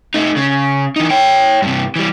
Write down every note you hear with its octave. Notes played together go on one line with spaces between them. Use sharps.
A3 D#4
C#3
E3 D#4
C#5 G5
G2 C3
E3 G3